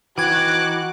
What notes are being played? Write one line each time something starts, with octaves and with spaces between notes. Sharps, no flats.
E3 D#4 F#4 G5 D6 F#6 G#6